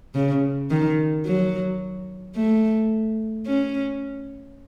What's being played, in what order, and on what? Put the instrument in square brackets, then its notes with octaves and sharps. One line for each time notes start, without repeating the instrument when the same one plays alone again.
[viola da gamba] C#3
D#3
F#3
A3
C#4